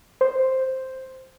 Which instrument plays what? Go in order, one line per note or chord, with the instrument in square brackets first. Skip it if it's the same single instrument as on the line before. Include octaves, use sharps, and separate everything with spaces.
[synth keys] C5